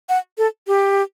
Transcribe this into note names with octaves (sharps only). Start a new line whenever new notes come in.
F#5
A4
G4